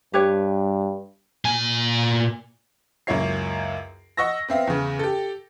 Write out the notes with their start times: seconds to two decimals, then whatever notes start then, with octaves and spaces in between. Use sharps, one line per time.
0.14 G2 G4 B4 C#5
1.45 A#2 G#5
3.07 C#2 F#2 A#3 E4 C#5 C7
4.17 D#5 F#5 C#6 E6 A#6
4.49 B3 C4 E5 F5
4.67 E2 C#3
4.99 G4 A4